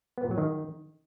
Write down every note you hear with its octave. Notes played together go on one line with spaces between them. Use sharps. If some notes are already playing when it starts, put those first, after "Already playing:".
B3
A#2
F#3
D#3